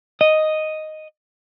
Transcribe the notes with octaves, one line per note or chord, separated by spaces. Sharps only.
D#5